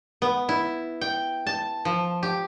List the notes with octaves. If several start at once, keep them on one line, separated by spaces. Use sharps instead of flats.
B3
E4
G5
A5
F3
G4